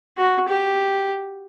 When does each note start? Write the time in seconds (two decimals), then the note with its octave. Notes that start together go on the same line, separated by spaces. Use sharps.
0.18 F#4
0.48 G4